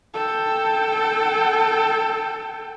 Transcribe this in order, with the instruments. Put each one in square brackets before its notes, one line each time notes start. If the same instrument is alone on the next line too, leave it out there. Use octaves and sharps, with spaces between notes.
[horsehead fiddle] A4 G5